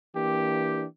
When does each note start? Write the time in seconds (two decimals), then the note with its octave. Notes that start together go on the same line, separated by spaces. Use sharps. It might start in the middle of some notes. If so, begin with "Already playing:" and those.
0.15 E3 A#3 D4 G4